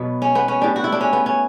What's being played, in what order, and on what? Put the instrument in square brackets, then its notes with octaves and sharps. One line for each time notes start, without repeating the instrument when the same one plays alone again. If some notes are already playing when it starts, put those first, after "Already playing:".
Already playing: [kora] B2 F#3 B3
C#4
B3
C#4
A2 G3 D4
F#4
E4
D4
C#4
B3
C#4